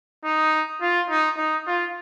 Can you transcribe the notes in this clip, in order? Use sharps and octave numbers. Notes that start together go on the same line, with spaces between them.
D#4
F4
D#4
D#4
F4